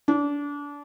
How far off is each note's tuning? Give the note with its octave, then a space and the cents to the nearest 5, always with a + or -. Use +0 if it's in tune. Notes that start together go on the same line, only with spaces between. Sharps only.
D4 -25